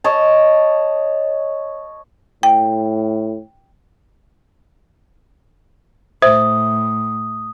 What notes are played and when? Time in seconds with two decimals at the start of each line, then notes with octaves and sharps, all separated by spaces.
0.04 C#5 D#5 A5
2.43 A2 G5
6.22 A2 C5 E5 D#6